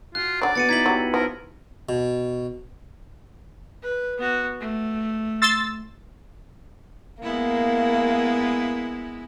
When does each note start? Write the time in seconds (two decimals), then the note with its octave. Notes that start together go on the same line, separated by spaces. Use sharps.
0.15 F4 F#4 G#5 F#6
0.42 D3 F#3 D5 D#6
0.55 B3 F#4 G#5 A6 C#7 D#7
0.69 D#4 E4 D#5 G#6 B6 F#7
0.86 F#3 F#4 G4
1.14 F3 D#4 A#4 B4
1.89 B2
3.82 B4
4.18 B3 F#4
4.60 A3
5.42 C6 E6 A6
7.23 G#3 A#3 B3 E4